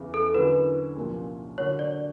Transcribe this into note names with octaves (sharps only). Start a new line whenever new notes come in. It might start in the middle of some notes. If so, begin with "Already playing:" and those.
Already playing: E2 C#3 E3
A4
D3 F#3 A#3 C#4 E4 B4
C2 A#2 F3 A#3 C#4
D3 F#3 A#3 D4 F#4 C#5
D5